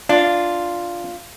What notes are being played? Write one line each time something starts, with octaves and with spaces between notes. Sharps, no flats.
D4 F4